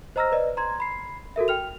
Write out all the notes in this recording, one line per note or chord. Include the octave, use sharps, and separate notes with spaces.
C5 D#5 A#5 E6 F6 A#6
B4 D5 D#5
A#5 C6 G#6
B5 C7
F#4 A4 A#4 E5
G5 F6 F7